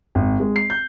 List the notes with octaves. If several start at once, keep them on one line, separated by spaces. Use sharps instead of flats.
G#1
G#3
C7
G6